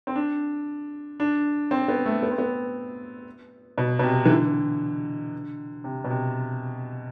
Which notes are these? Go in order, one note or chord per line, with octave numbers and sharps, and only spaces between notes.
C4
D4
D4
C4
B3
A3
B3
C4
B3
B2
B2
C3
E3
D3
C3
B2
C3